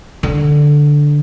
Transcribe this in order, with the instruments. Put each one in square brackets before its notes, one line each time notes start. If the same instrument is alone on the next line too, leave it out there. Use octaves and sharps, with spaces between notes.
[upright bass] D3